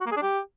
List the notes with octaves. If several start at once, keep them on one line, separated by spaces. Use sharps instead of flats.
F#4
A#3
G#4
D4
G4